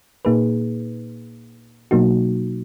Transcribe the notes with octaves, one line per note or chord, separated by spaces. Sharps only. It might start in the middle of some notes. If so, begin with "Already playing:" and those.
A#2 A#3 D#4 G#4 B4
B2 F#3 A#3 D#4 F#4